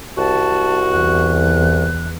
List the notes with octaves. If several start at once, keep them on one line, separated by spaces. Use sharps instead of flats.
C2 F#4 A5
E2 F#6